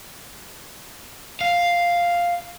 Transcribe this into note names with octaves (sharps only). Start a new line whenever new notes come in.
F5